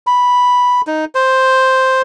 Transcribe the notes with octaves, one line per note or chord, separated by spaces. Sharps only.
B5
D#4
C5